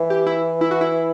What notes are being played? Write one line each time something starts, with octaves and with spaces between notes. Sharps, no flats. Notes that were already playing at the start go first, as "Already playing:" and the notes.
Already playing: E3
G4
E4
E4
F#4
E4